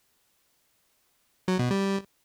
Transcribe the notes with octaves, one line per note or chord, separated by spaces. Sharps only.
F#3
B2
G3